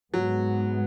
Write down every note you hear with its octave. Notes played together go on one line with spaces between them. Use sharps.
G#2 F#3 G#3 B3